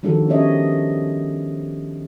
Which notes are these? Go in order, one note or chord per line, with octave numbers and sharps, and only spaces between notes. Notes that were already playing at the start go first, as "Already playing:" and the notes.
D#3 F3 G3 D4 F#4 A4
B3 C#4 G4 C#5 D#5 E5